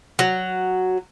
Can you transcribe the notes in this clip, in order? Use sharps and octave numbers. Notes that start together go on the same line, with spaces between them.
F#3